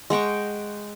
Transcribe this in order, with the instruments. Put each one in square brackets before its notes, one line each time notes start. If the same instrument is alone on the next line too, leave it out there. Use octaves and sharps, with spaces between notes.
[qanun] G#3 F#5 G5 C#6